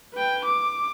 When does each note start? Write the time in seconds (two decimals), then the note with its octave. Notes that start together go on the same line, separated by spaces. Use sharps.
0.14 B4 G5
0.45 D6